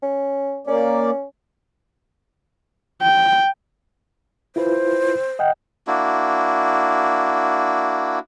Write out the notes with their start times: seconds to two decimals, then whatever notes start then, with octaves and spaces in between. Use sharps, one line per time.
0.03 C#4
0.67 A#3 C#4 D5
3.02 G5
4.56 E4 F4 B4 C5
5.39 D#5 F#5 G5
5.87 A#3 D4 E4 F#4